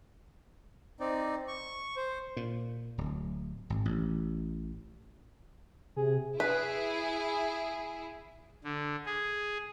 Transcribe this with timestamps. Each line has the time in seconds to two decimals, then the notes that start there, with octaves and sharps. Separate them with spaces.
1.00 C4 D#4 D5
1.48 C#6
1.97 C5
2.37 A#2
2.98 D1
3.70 G#1
3.85 A1
5.96 C3 G#4
6.40 E4 G#4 B4
8.64 D3
9.06 G#4